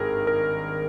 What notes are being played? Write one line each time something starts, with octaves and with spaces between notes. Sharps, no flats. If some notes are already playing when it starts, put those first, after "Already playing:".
Already playing: G#1 G2 D#3 G#4 A#4
A#4